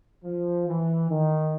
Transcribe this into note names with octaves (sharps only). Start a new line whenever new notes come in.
F3
E3
D#3